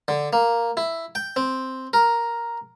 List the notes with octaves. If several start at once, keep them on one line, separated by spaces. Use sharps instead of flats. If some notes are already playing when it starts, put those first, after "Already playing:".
D3
A#3
E4
G5
C4
A#4